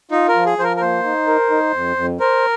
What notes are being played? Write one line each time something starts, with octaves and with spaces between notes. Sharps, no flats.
D#4 F4
A#4
F3
G#4
F3 C5
A#4
A#4
A#3 C5
D#4
A#4
D#4
F2
F2
A#4 C5